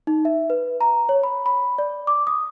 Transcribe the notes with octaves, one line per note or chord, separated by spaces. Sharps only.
D#4
E5
B4
A#5
C#5
B5
B5
D5
D6
D#6